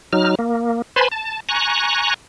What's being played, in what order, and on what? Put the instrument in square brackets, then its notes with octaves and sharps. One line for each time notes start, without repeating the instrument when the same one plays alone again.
[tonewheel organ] F#3 D#4 F6
A#3
B4 C5 G#5 A5 B5 C6
A5
G#5 A#5 C#6 F#6